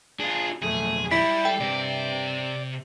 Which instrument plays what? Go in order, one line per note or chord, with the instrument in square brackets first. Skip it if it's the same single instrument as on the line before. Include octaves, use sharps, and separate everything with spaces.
[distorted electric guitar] D4 F4 [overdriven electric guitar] G#4
[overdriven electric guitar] B1 F2 [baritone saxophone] A3 [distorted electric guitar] G#4
[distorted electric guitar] G3 D5 [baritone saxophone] E4 [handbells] B6
[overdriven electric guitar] A4 [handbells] G5
[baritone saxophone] G2 [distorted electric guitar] C3 [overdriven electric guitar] D5